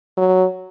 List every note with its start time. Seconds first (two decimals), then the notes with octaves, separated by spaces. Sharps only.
0.17 F#3